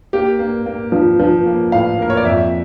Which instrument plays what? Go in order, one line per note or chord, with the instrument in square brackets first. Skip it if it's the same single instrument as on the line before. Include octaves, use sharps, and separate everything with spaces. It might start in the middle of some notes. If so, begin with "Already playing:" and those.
[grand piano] A#3 G4
A#3
A#3
F3
F3
A#3
A2 F5
A#3 A#4
C#5
D5
F2 E5